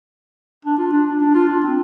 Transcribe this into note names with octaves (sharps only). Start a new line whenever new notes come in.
D4
F4
D4
D4
D4
F4
D4
C4